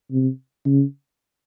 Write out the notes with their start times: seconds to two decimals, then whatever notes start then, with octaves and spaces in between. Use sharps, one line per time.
0.11 C3
0.65 C#3